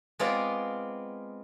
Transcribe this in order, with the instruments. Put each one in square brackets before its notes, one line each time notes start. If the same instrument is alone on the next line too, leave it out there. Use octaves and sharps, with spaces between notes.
[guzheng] G#3 B3 C4 F4 A#4 D5